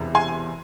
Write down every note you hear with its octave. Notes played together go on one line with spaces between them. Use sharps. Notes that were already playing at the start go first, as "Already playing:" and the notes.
Already playing: E1 E2 C3
G#5 C6